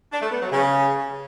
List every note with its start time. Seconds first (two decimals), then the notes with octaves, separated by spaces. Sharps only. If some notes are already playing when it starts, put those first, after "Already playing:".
0.11 D4
0.21 A3
0.31 B3
0.41 F#3
0.51 C#3